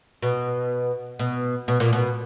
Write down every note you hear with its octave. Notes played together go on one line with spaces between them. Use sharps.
B2
B2
B2
A#2
B2